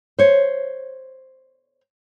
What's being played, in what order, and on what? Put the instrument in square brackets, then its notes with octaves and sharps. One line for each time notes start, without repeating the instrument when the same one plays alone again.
[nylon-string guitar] C5 C#5